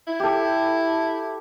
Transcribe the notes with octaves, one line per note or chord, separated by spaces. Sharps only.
E4
G4 A4